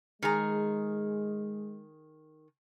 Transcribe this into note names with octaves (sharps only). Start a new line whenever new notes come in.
D#3 G#3 G#4 A#5